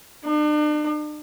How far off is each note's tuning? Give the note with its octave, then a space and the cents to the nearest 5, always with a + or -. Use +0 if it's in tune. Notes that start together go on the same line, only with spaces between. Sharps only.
D4 +40